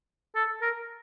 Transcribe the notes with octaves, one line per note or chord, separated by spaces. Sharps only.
A4
A#4